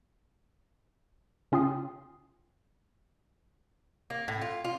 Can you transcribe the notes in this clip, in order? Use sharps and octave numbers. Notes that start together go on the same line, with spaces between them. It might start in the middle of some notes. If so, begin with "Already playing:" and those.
C#3 C#4 F4 G5 D#6 C7
A#3
A2
F4
F4